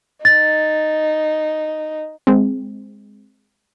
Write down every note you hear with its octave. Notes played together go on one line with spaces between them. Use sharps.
D#4 A6
G#3 C4